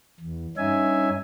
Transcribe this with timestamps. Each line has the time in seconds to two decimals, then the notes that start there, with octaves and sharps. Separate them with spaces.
0.20 E2
0.57 G2 C#4 D#4 E5 G#5